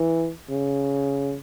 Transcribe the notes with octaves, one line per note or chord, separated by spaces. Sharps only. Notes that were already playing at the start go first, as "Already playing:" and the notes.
Already playing: E3
C#3